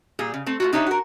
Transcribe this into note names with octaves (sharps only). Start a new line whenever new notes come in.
A#2 G3 G#4
C#3
A3 C4
A3 F4 F#4
D4 D#4 G4 C5 C#5 E5
F#4 A#4